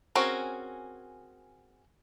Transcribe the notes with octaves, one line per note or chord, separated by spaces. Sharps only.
C4 C#4 F#4 G#4 A#4